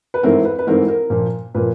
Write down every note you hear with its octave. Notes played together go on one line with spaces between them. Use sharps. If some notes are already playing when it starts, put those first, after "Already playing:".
B4
G#2 E3 A3 C4 A#4
B4
B4
G#2 E3 A3 C4 A#4
A#4
A#2 F3 A#3
A#2 F3 A#3 B4